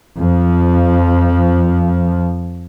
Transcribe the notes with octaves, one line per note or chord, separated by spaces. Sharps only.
F2 F3